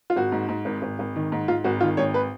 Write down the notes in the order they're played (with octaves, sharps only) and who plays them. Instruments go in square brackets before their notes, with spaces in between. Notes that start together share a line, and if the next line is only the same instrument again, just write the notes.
[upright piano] F4
G#1 F#4
G#2
G#2
G#1
G#1
G#1
D#3
G#2
G#2 F4
G#1 F#4
D#3 F4
G#1 C#5
B4